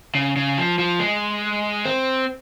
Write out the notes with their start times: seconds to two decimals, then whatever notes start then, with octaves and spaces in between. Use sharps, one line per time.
0.15 C#3
0.36 C#3
0.58 F3
0.79 F3
1.00 G#3
1.85 C4